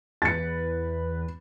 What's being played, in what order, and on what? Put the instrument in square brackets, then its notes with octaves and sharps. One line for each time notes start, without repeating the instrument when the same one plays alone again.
[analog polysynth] E2 B4 [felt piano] A6 C#7